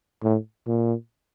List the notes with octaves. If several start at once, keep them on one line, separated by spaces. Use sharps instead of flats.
A2
A#2